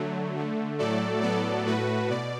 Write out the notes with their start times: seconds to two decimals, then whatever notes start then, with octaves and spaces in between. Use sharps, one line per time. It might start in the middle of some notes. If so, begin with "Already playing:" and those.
Already playing: D3 F#3 A3
0.36 D3 A3
0.78 A2 F#3 A3 A4 D5
1.22 A2 F#3 B3 A4 D5
1.66 A2 A3 F#4 B4
2.10 B2 D5